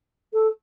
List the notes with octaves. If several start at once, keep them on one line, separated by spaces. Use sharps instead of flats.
A4